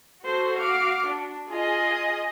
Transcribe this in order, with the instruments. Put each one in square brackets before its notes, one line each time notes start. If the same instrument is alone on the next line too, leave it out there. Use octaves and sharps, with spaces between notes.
[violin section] F#4 [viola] A4 C5
[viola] F5 D6
D4
[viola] F4 [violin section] G#4 D#5